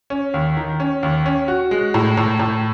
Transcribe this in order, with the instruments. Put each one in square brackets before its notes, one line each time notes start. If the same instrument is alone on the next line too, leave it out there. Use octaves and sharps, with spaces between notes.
[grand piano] C#4
D#2
D#3
C#4
D#2
C#4
F#4
G#3
A2
A2
A2